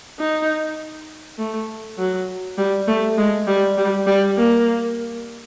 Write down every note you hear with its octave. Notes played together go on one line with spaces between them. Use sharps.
D#4
A3
F#3
G3
A3
G#3
G3
G3
G3
A#3